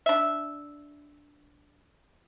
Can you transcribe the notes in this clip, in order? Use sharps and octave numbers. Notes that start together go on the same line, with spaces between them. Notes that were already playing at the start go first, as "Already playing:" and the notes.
D4 E5